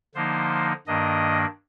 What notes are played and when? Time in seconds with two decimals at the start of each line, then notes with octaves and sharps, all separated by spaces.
0.15 D3 F3 A#3 D#4 C5
0.87 G2 D#3 A#3 D4 D#5